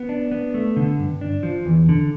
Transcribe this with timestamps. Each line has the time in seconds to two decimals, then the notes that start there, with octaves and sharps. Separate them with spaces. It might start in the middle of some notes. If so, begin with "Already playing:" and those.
Already playing: B3
0.09 D4
0.31 B3
0.54 A3
0.77 D3
0.99 G2
1.21 D4
1.43 F3
1.66 E2
1.89 D3